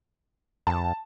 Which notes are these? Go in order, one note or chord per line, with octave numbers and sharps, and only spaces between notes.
F2 A5